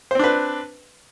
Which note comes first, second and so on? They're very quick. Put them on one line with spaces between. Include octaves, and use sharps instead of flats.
C5 C4 D4 B4